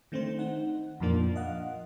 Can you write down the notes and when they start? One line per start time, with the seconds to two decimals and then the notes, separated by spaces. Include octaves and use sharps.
0.12 D#3 A3 C4 D4 C5
0.39 D#4 F#5
1.00 F2 A#2 F3 A#3 D4
1.36 D#5 F5 F#5